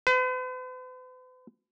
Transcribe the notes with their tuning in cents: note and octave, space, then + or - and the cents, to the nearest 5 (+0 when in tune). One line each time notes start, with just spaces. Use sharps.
B4 +45